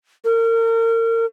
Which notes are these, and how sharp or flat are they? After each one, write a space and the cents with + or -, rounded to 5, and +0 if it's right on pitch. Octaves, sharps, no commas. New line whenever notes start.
A#4 -35